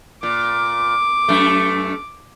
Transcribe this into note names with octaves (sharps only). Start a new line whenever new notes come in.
A#2 D6
F#2 A3